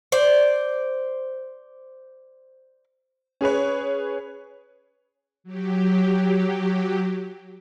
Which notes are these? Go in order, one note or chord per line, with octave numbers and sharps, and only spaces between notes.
C5 D5
C#4 G#4 B4 C#5
F#3 G4